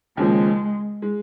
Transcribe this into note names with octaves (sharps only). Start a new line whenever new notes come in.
D#2 C#3 F3 G#3
G#3